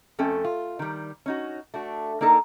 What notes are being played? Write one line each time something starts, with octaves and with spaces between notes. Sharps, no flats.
F2 A3 C#4 A4 G5
F4
D#3 G3
C#4 D#4 F#4
A3 D4 F#4
A#3 D4 D#4 A4 A#4